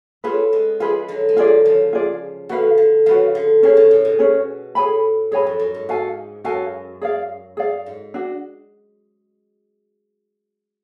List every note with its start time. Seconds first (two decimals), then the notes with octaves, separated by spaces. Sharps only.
0.24 A3 C#4 F4 G#4 B4
0.53 G#3 B3
0.80 F3 G#3 F4 G#4 B4
1.08 D3 F#3
1.29 G#3
1.37 D3 F#3 F4 G#4 D5
1.65 C#3 F3
1.93 F4 G#4 D5
2.49 D3 F#4 B4 F5
2.78 D3
3.06 C#3 F3 F#4 B4 F5
3.35 D3
3.63 D3 C#4 G#4 C#5
3.77 C#3
3.91 A2
4.05 B2
4.19 C#4 G#4 C#5
4.75 A2 G#4 C#5 G#5 B5
5.31 F#2 G#4 C#5 G#5 B5
5.47 F2
5.60 F#2
5.74 G#2
5.89 G#2 F#4 A4 F5 G#5
6.44 F#2 F#4 A4 F5 G#5
7.01 G#4 D5 F5
7.57 G#4 D5 F5
7.86 G#2
8.14 D4 F#4